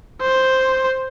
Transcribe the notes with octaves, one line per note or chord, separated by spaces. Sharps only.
C5